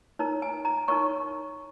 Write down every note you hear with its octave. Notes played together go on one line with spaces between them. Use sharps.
D#4 A#4 C#5 A#5
G#5
A#5
D#4 A#4 C#5 C#6